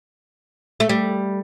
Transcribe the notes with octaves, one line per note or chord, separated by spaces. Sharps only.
A3
G3